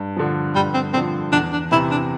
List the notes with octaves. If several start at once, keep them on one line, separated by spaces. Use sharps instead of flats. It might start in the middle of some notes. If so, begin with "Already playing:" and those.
Already playing: G2
D3 F3
G2 G3
C4
D3 F3 C4
E2 D4
D4
C3 E3 E4
D4